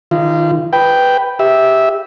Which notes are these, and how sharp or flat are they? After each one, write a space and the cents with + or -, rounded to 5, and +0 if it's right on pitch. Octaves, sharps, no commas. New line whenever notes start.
D#3 +0 F4 -30
B4 +0 G5 +0
G4 +0 E5 -10